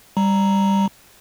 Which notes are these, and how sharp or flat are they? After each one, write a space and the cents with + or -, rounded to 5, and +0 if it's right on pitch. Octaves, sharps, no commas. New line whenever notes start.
G3 +10 A#5 +0